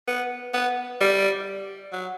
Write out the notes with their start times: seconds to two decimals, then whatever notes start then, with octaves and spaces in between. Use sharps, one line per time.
0.07 B3
0.54 B3
1.01 G3
1.92 F#3